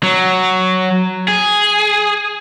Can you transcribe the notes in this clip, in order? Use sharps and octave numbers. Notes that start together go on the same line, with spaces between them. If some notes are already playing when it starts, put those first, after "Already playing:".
F#3
G#4